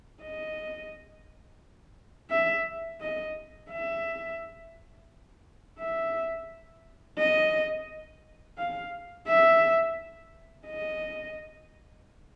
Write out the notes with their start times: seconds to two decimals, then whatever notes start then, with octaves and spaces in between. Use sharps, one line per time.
0.22 D#5
2.30 E5
3.01 D#5
3.71 E5
5.79 E5
7.19 D#5
8.58 F5
9.28 E5
10.67 D#5